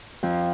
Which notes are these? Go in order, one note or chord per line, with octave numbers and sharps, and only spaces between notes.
F2 F3